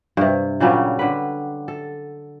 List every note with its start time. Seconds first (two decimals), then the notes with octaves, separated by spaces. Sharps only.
0.17 G2 C3
0.60 A#2 C#3 F#3 G3
0.99 D3 B4
1.68 A4